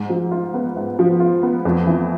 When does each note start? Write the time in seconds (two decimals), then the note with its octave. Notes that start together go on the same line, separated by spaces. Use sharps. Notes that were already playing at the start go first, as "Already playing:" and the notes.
Already playing: G#2
0.09 F3
0.31 F4
0.54 B3
0.76 G#2
0.99 F3
1.20 F4
1.43 B3
1.65 F2
1.86 E3